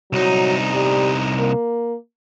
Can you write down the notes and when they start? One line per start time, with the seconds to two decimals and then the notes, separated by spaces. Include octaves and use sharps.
0.13 C2 F#3 D#4
0.73 G3
1.38 A#3